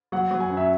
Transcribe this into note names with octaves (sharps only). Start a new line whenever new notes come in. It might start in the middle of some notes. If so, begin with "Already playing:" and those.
F#3 F#5
F#3
G#5
F#2
E5